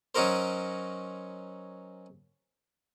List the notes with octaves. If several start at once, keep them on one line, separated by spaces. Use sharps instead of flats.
F#3 C#4 D#4 F#4 A#4 C5